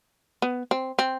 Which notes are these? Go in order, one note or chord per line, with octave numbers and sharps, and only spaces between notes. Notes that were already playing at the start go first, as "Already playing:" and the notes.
B3
C4
C4